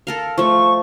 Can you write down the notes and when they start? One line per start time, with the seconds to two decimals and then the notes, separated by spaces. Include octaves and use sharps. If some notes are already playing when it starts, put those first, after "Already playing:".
0.07 A4 A#4 F5
0.38 F3 A3 C#6